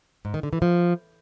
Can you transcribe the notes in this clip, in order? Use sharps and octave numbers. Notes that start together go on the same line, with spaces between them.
G#2
D#3
D3
E3
F3